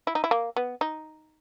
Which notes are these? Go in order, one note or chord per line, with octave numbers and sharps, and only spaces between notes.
E4
D#4
E4
A#3
B3
D#4